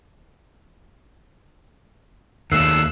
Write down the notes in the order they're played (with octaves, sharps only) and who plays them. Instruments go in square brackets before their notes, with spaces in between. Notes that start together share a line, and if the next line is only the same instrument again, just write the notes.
[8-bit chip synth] D#2 F#6 C7 [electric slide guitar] D#3 A3 [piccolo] E6